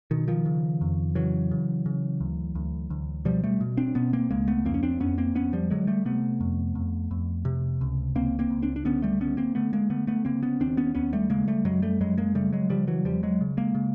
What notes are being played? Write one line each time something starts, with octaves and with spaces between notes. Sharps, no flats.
B2 D#3
D#3 F3
C#3
F2
C#3 E3 F#3
C#3
C#3
D2
D2
D2
B2 F3 G3
G3 A3
B2
C4 D4
B2 B3 C#4
A#3 C4
C#2 G#3 A#3
A3 B3
F2 A#3 C4
C#4
C4 D4
F2 B3 C#4
A#3 C4
F2 B3 C#4
F3 G3
D3 F#3 G#3
G3 A3
C3 A3 B3
F2
F2
F2
C3
C#2
C#2 A#3 C4
A#3 C4
C#2
C4 D4
D4
D3 B3 C#4
G3 A3
D3 B3 C#4
A#3 C4
D3 A3 B3
G#3 A#3
D3 A3 B3
A3 B3
C#3 A#3 C4
B3 C#4
D#2 C4 D4
B3 C#4
D#2 B3 C#4
G3 A3
C#3 G#3 A#3
G3 A3
F#2 F#3 G#3
G3 A3
F#2 F#3 G#3
G#3 A#3
C#3 G3 A3
F#3 G#3
C#3 F3 G3
E3 F#3
E2 F3 G3
F#3 G#3
C#3
G#3 A#3
C#3